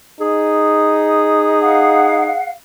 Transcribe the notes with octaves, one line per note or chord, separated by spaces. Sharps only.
D#4 G#4
F5 F#5